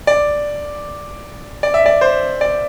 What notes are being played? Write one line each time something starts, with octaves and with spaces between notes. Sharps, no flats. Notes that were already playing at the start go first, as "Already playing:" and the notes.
D5
D5
E5
D5
C5
D5